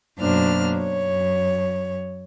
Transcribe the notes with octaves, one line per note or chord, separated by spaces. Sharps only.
F#2 B2 A#3 D4 C5 F6
F#2 C#5